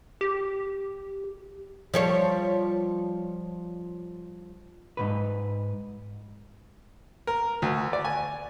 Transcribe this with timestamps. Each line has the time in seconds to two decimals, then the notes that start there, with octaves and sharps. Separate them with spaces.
0.21 G4
1.94 F3 G3 C#5
4.97 G#2 B2 B4
7.27 A#4
7.62 D2
7.93 D5
8.05 G#5